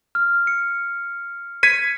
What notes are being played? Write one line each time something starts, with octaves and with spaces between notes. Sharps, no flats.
F6
C#7
G#6 B6 C#7 D#7